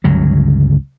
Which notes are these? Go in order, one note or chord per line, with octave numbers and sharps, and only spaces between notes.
G1 C#2 C#3 F#3